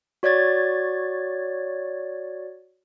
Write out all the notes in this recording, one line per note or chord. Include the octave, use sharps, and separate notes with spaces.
F#4 C#5 D5 G#6 A6